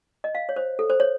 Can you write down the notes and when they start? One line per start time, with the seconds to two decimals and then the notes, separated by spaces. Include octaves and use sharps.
0.24 D#5
0.35 F5
0.49 C#5
0.56 C5
0.79 A4
0.90 C5
1.00 C#5